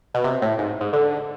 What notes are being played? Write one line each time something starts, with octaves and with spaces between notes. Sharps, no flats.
B2
C3
A2
G#2
G#2
D3